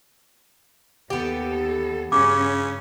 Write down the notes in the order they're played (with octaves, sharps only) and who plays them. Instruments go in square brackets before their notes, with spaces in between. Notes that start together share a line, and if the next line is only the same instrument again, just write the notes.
[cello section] D#2 A4 [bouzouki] B3 G4
[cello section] G2 C#4 [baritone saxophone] C#3 [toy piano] D6